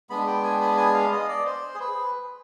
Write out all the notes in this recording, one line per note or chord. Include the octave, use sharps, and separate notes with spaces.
G#3 B3 D4 B5
G5
G#5
B5
G#5
F5
D#5
D5
C5
G#4
B4